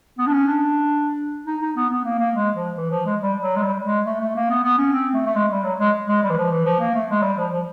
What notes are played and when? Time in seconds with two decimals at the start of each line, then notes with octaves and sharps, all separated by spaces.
0.18 B3
0.27 D4
0.32 C#4
0.46 D4
1.47 D#4
1.62 D#4
1.76 B3
1.90 B3
2.04 A#3
2.19 A#3
2.34 G#3
2.55 F3
2.77 E3
2.91 F3
3.06 G#3
3.20 G3
3.42 F#3
3.56 G#3
3.63 G3
3.85 G#3
4.06 A3
4.21 A3
4.36 A#3
4.50 B3
4.63 B3
4.78 C#4
4.92 C4
5.14 A3
5.26 A3
5.36 G#3
5.51 G3
5.64 F#3
5.79 G#3
6.08 G#3
6.23 G3
6.29 E3
6.37 F3
6.51 E3
6.65 F3
6.80 A#3
6.94 A3
7.09 G#3
7.23 G3
7.37 F3
7.53 F3